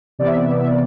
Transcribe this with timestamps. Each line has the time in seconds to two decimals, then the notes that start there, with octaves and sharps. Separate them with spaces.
0.19 C3 E3 B3 D5
0.27 E5
0.35 D5
0.44 E5
0.50 D5
0.59 E5
0.67 D5